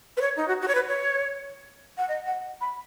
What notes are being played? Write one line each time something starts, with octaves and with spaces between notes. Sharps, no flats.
B4
C#5
D#4
F#4
F#4
C#5
B4
C#5
F#5
D#5
F#5
B5